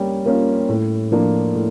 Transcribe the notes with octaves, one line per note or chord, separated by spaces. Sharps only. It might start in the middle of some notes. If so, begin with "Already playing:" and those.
Already playing: G3 A#3 C#4
A#3 C#4 F4
A2
F3 A#3 D4 F4
A2